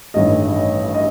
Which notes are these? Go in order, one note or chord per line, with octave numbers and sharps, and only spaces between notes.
A1 G2 D#3 A3 D#5
D#5